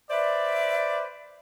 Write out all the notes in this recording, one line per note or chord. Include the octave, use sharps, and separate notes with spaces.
B4 C5 D5 E5